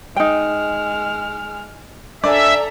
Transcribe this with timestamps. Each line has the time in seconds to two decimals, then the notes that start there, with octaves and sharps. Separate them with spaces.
0.16 G#3 D#4 G5 F6
2.24 D4 A4 D5 E5 G#5 A#5